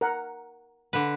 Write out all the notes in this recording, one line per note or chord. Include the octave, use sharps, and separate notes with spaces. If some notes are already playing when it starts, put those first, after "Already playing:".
A#4 F#5
D3 B4